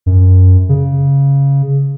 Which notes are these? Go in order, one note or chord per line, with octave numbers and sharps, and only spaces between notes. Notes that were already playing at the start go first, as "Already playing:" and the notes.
F#2
C#3